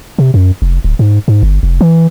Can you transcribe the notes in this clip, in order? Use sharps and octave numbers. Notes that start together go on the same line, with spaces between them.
C3
F#2
F1
D1
G#2
G#2
G1
F1
E3